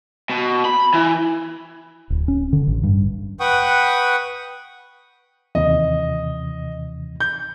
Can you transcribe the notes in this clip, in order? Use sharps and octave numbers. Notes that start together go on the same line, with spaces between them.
B2
B5
E3
D1
C#4
D3
A1
G2
B4 F#5 G5 C#6 D#6
D#2 C3 E3 D#5
G6